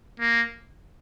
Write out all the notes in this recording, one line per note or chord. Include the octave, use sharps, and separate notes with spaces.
A#3